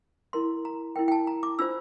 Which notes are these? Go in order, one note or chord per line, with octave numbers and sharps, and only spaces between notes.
E4 A#4 C6
A#5
E4 A#4 G5
G5
A5
A#5
D6
D4 F4 C5 E6